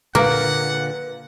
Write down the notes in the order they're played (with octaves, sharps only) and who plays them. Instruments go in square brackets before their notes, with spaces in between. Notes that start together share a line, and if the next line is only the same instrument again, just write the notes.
[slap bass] A#2 D3 [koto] A#3 [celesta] B4 F5 [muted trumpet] F#5